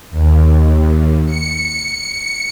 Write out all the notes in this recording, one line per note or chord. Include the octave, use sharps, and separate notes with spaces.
D#2
C#7